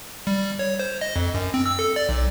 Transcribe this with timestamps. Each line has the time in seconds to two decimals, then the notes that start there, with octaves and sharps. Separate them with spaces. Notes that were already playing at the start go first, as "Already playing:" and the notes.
0.27 G3
0.59 C#5
0.79 C5
1.01 D#5
1.16 F2
1.34 F#2
1.54 C4
1.66 E6
1.79 A4
1.96 D5
2.09 B1